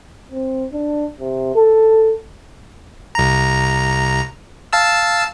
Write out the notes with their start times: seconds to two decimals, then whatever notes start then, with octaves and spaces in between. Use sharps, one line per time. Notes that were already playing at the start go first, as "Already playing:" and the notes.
0.32 C4
0.73 D4
1.20 C3
1.55 A4
3.15 C2 A#5
4.73 F5 A5 E6